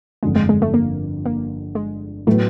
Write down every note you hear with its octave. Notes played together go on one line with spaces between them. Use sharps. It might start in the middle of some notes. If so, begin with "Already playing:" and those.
G1 F2 D3 G#3
G#3
G#3
A3
A#3
A#3
G#3
A2 F#3 A3 B3